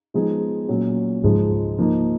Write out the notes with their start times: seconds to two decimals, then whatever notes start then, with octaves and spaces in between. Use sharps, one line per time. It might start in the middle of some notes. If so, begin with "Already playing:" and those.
0.14 F3 G#3 B3 D#4 G#4
0.68 A#2 F#3 C#4
1.23 C#2 G#2 C#3 F3 G#3 D#4
1.78 F3 A#3 D#4